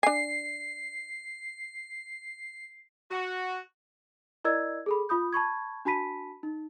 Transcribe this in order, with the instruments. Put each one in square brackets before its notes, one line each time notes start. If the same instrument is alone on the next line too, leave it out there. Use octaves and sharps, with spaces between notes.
[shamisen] D4 G#5 [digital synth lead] C7
[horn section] F#4
[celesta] E4 A#4 D5 D#5 E6 G#6
G#4 A4 B5
F4 B5 D#6 G6
A5 B5 C#6 G#6
D4 F#4 A5 B5 B6 D#7
D#4